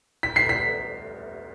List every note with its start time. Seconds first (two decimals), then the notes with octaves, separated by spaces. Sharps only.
0.23 B6
0.36 C7
0.49 B6